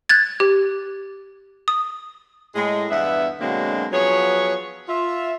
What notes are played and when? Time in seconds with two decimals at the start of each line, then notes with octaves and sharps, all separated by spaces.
0.09 F#6 G#6 A6
0.40 G4
1.68 D#6
2.55 A2 G#3 A3
2.91 E2 G2 B3 E5
3.40 B2 D3 F#3 G#3 A#3 C4
3.92 F3 F#3 B3 G#4 C#5
4.88 F4 E5